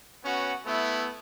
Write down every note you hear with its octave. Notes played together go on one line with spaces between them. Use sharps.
B3 C#4 F#4
A3 B3 E4